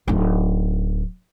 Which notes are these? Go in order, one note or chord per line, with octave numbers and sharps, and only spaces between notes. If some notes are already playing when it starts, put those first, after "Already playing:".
D1 D#4